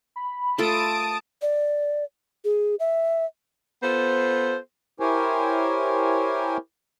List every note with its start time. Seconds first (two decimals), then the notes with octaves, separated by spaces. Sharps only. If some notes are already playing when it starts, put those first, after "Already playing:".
0.16 B5
0.58 A3 F4 A4 A5 D#6 D7
1.42 D5
2.44 G#4
2.80 E5
3.83 B3 F4 A4 C5
5.00 E4 G4 A#4 C5 C#5 G#5